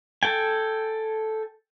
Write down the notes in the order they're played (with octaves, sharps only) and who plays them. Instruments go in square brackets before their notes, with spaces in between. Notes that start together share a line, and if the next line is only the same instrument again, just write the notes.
[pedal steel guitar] A4 G5 G#5